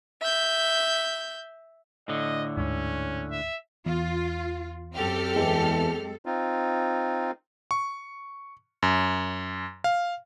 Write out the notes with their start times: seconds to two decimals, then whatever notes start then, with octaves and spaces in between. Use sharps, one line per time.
0.21 E5 G6
2.08 A2 D3 D#5
2.57 D2 G#2 C#4
3.31 E5
3.86 E2 F4
4.95 F#2 C4 G4 A4 F6
5.36 E2 E3 G#3 A5
6.26 C4 D#4 F4
7.71 C#6
8.82 F#2
9.84 F5